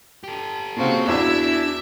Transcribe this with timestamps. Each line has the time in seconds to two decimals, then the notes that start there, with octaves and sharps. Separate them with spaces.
0.24 G4 A4
0.76 A#2 C#3 C4 F#4
1.08 E2 D4 E4 F#4 E5 E6